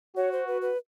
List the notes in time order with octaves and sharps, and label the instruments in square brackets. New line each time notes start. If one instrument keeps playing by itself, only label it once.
[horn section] F#4 [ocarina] C#5
[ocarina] C5
B4
B4